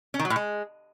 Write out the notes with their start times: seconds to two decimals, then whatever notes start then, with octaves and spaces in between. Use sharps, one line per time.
0.14 C#4
0.19 D#3
0.25 F#3
0.30 A2
0.36 G#3